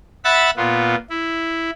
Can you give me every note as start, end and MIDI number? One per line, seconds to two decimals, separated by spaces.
0.24 0.50 76
0.24 0.50 78
0.24 0.50 83
0.24 0.50 88
0.24 0.50 90
0.24 0.50 93
0.57 0.95 46
0.57 0.95 59
0.57 0.95 65
1.10 1.71 64